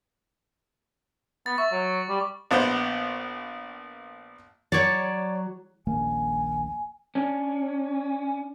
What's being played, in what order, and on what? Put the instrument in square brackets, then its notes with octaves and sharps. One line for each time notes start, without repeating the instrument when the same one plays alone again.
[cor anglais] B3 [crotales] A6
[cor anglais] E5 [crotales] C#6
[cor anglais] F#3
G3
[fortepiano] A#1 B3 C5
[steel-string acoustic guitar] F#3 [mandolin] C#5 D5 A5
[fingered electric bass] D#1 A#1 A#3 [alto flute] G#5
[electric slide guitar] C#4 D4